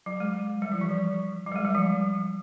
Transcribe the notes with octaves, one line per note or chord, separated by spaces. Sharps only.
F#3
G#3
G3
F3
E3
F3
F#3
G3
G#3
G3
F3